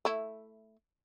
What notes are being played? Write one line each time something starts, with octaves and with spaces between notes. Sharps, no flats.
A3 E4